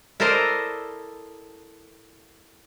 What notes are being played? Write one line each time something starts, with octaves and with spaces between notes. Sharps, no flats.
E4 A4 A#4 C5 D5 D#5